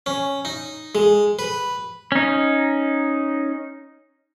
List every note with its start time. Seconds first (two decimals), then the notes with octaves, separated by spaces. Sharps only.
0.06 C#4
0.45 D#4
0.95 G#3
1.39 B4
2.12 C#4 D#4